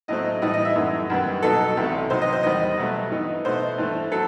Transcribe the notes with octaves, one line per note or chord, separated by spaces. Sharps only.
A2 F#3 A3 C4 D#5
A2 E3 G3 D#4 D#5
D#5
E5
F#2 E3 A3 D#4
F#2 D#3 G3 B3
B2 F#3 B3 D#4 A4
C2 C3 E3 A3 D#4
C3 F#3 B3 D#4 C5
D#5
C5
E2 D#3 G3 D#5
B2 F#3 A3
G2 E3 B3 D#4
B2 A3 D#4 C5
G2 E3 A3
F#3 A4